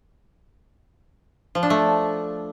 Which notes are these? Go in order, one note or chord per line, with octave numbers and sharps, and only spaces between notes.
F3
D4
A3